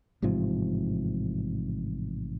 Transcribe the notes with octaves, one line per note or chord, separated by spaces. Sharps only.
A1 G#2 C3 F3